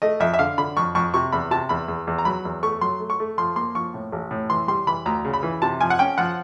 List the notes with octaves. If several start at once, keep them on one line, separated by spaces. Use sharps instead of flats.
A3 D#5
F2 E5
E5
D3 F5
D3 B5
F2 C#6
F2 C#6
C3 C#6
E2 B5
C3 A5
E2 B5
E2
E2
A#5
F#3 B5
E2
A3 C#6
F#3 C6
A3
C#6
A3
F3 C6
A#3 C6
F3 C#6
A2
A1
A2
E3 C6
G3 C6
E3 B5
D2 A#5
C#3
B5
E3
C3 A5
F3 G#5
F#5
C#4 G5
F3 F#5